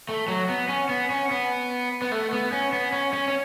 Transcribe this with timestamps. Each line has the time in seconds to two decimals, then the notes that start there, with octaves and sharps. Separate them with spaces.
0.09 A3
0.28 F#3
0.49 B3
0.69 C#4
0.89 B3
1.10 C#4
1.31 B3
2.02 B3
2.12 A3
2.33 B3
2.52 C#4
2.73 B3
2.92 C#4
3.13 C#4
3.28 C#4